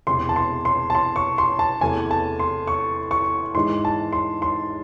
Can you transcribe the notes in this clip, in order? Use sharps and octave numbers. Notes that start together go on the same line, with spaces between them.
E1 E2 C3 C6
A5
C6
C6
A5
C6
C#6
C6
A5
E2 C3 E3 A3 G#5
A5
C6
C#6
C#6
G#1 G#2 E3 G#3 C6
A5
C6
C6